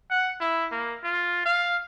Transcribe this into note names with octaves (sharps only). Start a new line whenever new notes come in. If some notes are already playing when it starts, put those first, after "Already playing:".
F#5
E4
A#3
F4
F5